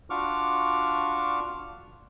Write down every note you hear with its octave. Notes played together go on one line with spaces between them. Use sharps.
D4 F4 F#4 C#6 D6 F6